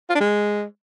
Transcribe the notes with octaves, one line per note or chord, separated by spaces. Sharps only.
F4
D4
G#3